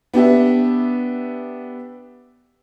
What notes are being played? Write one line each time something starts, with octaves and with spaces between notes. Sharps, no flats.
B3 D4 G4 E5